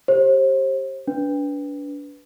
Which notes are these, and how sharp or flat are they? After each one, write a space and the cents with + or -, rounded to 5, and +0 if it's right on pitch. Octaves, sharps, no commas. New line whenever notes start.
G4 +0 C5 +35
D4 -35 B4 +0